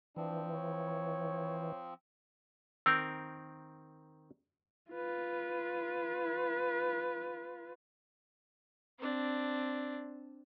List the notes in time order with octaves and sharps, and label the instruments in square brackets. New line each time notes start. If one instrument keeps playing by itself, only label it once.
[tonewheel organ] E3 [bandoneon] F3 C4 [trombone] D4
[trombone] C#5
[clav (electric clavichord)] D#3 C4 A#4 [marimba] E6 G6
[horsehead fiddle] F4 B4
[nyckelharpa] C4 D4